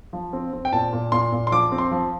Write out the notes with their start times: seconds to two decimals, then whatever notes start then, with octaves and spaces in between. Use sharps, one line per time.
0.13 F3
0.33 C4
0.53 C4
0.65 G5
0.73 A#2 A5
0.93 A#2
1.12 A#2 C6
1.32 A#2
1.47 C6
1.52 F3 D6
1.72 C4
1.78 C6
1.91 F3